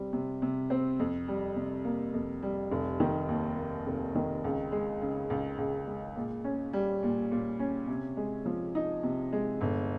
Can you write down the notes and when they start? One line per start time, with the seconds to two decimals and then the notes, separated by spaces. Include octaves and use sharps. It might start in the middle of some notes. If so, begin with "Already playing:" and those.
Already playing: C3 G3 C4
0.13 C3
0.42 C3
0.70 C4
0.99 F2
1.28 G3
1.56 C3
1.84 A#3
2.13 F2
2.43 G3
2.72 F1
3.00 D#3
3.28 D#2
3.57 A#3
3.86 F1
4.15 D#3
4.44 C#2
4.72 G#3
5.01 C#3
5.30 C#2
5.58 C#2
5.87 G#3
6.16 A#2
6.44 C#4
6.73 G3
7.03 A#2
7.32 A#2
7.59 C#4
7.88 C3
8.17 G#3
8.45 F3
8.75 D#4
9.03 C3
9.32 G#3
9.61 G1